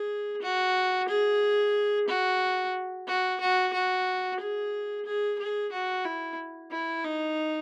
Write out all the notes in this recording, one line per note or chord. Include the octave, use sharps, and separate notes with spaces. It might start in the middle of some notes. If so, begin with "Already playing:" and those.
Already playing: G#4
F#4
G#4
F#4
F#4
F#4
F#4
G#4
G#4
G#4
F#4
E4
E4
D#4